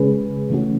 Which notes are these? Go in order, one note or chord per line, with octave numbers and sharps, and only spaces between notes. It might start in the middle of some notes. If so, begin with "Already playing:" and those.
Already playing: C#3 G#3 C#4 G#4 B4
C#3 E3 A3 C#4 F#4